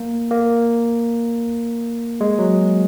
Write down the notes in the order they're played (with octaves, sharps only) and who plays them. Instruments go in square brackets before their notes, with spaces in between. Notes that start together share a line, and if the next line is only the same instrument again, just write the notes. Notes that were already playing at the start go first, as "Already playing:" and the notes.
Already playing: [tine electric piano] A#3
A#3
G#3
F#3